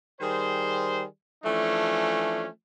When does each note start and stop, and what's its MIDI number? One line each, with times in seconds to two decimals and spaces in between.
0.21 1.03 51
0.21 1.03 55
0.21 1.03 68
0.21 1.03 72
1.44 2.46 52
1.44 2.46 53
1.44 2.46 57
1.44 2.46 61
1.44 2.46 62